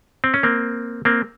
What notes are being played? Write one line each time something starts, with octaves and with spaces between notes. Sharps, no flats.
C4
C#4
A#3 C4
A#3 C4